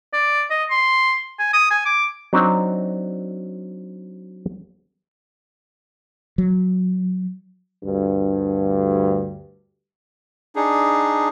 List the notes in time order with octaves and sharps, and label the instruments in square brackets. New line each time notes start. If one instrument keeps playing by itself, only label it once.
[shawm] D5
D#5
C6
G#5
D#6
G#5
D6
[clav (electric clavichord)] F#3 C4 D4 D#4
[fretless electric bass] F#3
[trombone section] D2 G2
[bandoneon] D4 D#4 G#4